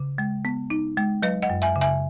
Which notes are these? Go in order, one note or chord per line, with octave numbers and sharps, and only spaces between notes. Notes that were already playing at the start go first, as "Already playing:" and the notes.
Already playing: C#3
G#3
B3
D#4
G#3
F#3 B4 D#5
D#5 F#5
F#2
E5 G#5
C#3
E5 G#5